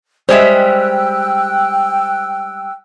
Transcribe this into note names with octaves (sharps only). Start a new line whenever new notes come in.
G3 G#3 C5 E5 G5 E6 F#6